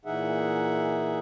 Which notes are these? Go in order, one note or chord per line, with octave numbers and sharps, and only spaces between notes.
A#2 E3 D#4 G#4 E5 F#5